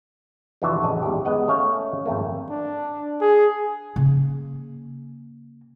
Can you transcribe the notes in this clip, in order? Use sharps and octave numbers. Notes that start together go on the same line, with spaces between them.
F2 C3 E3 D4 F#4 E5
A1 F#2 C#3 C#4 D#5 A5
E2 G#2 G3 G4
G#3 B3 D#5 F#5
A3 C#4 C#5 F5 G#5
G#1 F2 A3 A#3
D4
G#4
C#3 A#3